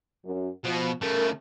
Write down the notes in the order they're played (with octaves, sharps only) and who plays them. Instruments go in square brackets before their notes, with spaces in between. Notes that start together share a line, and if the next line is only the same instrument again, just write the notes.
[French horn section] F#2
[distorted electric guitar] B2 [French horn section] F3
[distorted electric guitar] C#3 A3 [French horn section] A#4